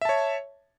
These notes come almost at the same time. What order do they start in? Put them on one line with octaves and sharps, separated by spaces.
E5 A5 C#5